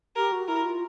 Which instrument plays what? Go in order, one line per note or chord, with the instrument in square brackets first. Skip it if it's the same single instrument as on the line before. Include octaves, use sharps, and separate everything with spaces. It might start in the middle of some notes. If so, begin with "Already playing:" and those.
[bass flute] G4 [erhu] A#4
[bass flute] F#4
[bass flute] E4 [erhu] A#4
[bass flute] F4